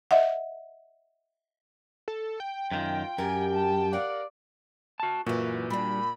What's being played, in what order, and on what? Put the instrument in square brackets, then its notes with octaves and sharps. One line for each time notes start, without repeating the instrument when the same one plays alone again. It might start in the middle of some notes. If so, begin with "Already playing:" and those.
[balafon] D#5 E5 F#5
[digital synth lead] A4
G5
[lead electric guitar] F#2 D#3 [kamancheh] F4
[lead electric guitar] F#2 [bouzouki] G4 A#4 [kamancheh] G#5
[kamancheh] A5
[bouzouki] A#4 F#5 [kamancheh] D5 F5
[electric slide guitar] F#4 A5
[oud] F#2 E3 [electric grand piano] A#2 [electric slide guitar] F#4
[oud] G3 D4 [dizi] B5